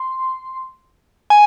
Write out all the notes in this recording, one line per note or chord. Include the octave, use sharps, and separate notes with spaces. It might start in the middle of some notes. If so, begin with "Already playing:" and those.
Already playing: C6
G#5